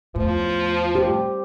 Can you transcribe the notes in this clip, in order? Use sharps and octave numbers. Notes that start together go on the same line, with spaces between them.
E2 A2 F3
G4 C5